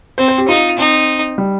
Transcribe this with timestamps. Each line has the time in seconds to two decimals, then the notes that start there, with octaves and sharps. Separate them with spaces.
0.18 C4 C5
0.28 C5
0.38 G4
0.48 D#4 F4
0.78 C4 D#4
1.38 G3